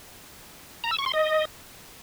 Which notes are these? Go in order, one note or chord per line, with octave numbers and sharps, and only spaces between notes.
A#5
E6
C#6
C6
D#5